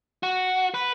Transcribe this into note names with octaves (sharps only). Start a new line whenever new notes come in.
F#4
B4